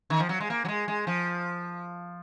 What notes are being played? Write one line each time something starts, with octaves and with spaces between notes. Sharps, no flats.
D#3
F3
F#3
G#3
A#3
F#3
G#3
G#3
F3